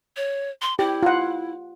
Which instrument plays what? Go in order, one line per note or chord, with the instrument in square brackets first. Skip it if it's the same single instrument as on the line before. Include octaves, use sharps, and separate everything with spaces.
[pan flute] C#5
C6
[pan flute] E4 [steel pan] G4
[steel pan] F4 F#5